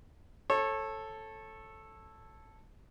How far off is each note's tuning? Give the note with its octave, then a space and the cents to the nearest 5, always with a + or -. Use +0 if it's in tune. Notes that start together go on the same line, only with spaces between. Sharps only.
A4 +0 C#5 -25